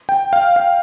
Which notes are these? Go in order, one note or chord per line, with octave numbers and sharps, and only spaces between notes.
G5
F5
F5